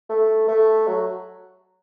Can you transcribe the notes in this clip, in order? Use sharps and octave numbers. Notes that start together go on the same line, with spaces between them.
A3
A3
F#3